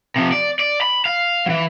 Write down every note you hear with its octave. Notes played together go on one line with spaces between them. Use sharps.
C3 F3
D5
D5
B5
F5
E3 F#3